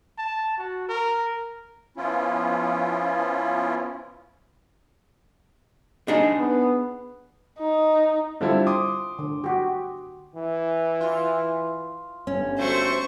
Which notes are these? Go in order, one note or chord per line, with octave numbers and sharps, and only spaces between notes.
A5
F#4
A#4
F3 B3 C#4 E4 F4
D4 D#4 G#4
B3
D#4
D3 G3 C4 E4 F4 A4
C6 D6 D#6
D3
F#4 G4
E3
F4
G1 C#4
A3 C4 F#4 C5 C#6